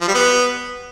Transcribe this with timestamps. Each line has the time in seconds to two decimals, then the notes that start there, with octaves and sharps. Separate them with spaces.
0.01 F3
0.08 G3
0.14 B3